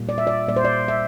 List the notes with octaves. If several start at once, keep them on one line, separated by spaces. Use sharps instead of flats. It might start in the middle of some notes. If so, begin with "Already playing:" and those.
Already playing: A#2 G3 A#3
D5
E5
D5
A#2 G3 A#3 D5
C5
D5
E5